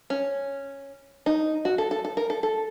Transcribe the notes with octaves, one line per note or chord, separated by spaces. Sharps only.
C#4
D#4
F#4
A4
A4
A4
A#4
A4
A4